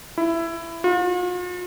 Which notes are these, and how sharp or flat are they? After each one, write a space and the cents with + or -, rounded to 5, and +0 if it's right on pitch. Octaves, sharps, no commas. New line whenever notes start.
E4 +15
F4 +45